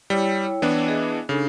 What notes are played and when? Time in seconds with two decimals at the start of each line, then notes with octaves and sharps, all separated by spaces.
0.10 G3 E4 C#5 G5
0.62 E3 B3 D4
0.84 G#4 D#5 E5
1.29 C#3 D4 D#4 A4